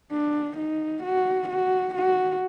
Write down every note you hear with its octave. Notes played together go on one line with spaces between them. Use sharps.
D4
D#4
F#4
F#4
F#4